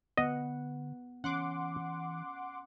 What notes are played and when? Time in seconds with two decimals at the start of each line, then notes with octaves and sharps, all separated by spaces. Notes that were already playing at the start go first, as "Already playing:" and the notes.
0.18 D3 B3 D#5 F#5
1.24 E3 C#4 F#5 C6 D6